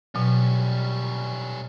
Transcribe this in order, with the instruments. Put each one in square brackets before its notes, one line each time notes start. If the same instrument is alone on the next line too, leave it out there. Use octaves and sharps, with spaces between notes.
[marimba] B2 F#3 [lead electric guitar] G3 C#4